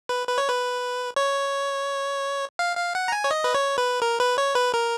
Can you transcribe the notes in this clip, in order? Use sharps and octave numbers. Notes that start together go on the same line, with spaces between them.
B4
B4
C#5
B4
C#5
F5
F5
F#5
A#5
G#5
C#5
D#5
B4
C#5
B4
A#4
B4
C#5
B4
A#4